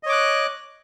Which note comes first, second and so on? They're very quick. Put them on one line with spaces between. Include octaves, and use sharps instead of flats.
D#5 C#5 D6 F#6